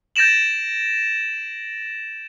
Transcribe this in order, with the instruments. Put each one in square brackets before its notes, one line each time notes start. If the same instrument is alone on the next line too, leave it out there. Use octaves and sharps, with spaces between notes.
[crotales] G6 A6 A#6 D7 E7 F#7